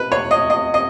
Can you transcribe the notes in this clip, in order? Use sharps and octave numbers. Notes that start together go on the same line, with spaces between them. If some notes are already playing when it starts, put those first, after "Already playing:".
Already playing: B4
C#5
D#5
D#5
D#5